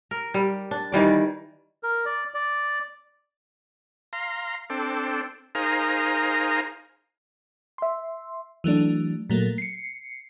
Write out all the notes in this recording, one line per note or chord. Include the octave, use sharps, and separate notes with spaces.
A#4
G3
D4
D#3 E3 G3 D5
A#4
D5
D5
F5 A#5 C6
C4 D4 A4
D#4 G#4 A#4 C5 F5 A#5
E5 C6
E3 F#3 A3 D4
A#2 F#3 A3 A#3
C7 C#7